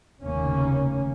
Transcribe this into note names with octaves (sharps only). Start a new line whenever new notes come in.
F1 D#2 C#3 A#3 C#4